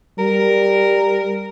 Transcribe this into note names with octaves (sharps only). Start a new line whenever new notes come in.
G3 A#4